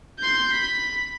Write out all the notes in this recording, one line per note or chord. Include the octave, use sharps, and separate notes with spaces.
C6 G6
B5